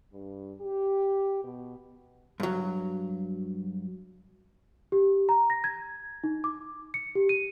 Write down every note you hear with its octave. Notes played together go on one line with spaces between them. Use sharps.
G2
G4
B2
G2 F#3
G4
A#5
A#6
G#6
D#4
D6
C#7
G4
D#7